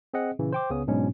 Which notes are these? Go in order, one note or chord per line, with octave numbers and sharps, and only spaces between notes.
C4 G#4 D#5 F#5
A#2 C#3 E3
C5 G5 D6
C#2 C#3 B3 C#4 D#6
G#2 B2 F#3 G#3 C#4 D4